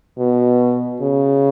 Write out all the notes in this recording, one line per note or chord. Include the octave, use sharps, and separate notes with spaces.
B2
C#3